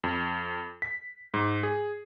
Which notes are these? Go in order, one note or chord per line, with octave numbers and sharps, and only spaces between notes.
F2
B6
G#2
G#4